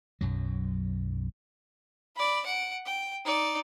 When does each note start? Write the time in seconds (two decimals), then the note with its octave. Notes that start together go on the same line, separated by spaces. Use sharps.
0.21 B1 F#2 F#3
2.16 D5 B5
2.46 F#5 D7
2.85 G5
3.25 D#4 D5